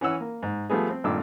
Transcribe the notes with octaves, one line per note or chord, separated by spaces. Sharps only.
E3 C#4 F#5 E6
A#3
G#2
F3 G3 A3 B3 G#4
C4
G#1 G2 A#2 A3 D6 E6